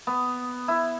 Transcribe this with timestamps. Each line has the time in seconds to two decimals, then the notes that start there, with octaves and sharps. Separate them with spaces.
0.07 B3
0.68 E4